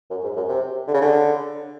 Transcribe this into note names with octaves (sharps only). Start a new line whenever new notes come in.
F#2
G#2
F#2
C3
D3
C#3
D3